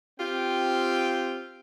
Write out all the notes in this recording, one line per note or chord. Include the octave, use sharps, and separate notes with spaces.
C4 F4 G4 G5